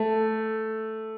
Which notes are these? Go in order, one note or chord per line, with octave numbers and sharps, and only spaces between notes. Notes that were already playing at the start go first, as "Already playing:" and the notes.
Already playing: A3